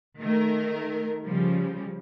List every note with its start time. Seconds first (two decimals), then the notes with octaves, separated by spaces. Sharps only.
0.21 D#3 A3 A#4
1.25 C#3 F3 G3